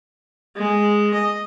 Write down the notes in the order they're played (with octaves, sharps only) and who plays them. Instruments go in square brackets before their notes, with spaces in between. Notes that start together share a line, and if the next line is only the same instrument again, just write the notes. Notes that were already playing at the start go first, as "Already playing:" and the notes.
[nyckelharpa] G#3
D#5